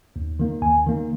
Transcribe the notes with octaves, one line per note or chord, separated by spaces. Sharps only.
D#2
D#3 A#3
D#2 G#5
D#3 A#3